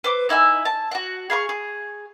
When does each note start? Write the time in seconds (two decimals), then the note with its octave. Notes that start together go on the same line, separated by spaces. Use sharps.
0.04 B4 C5 D6
0.29 D#4 E4 E5 G#5
0.65 A5
0.91 F#4 F#5
1.30 G#4 F5 B5 C#6
1.49 G#4